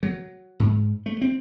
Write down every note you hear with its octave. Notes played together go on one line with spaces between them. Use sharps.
F#3
G#2
A3
C4